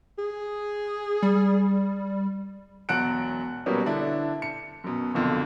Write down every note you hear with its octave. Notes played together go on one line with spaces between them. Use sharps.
G#4
G3
E1 F#3 F#5 A5 F#6 D7
B2 F#3 G3 A#3 B3 C#4
D3 D4 E4
C#7
F#2 B2
F#1 B1 F2 D3